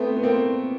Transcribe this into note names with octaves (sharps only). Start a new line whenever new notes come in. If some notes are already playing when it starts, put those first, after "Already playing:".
Already playing: A3 B3 C4
B3
A#3 C4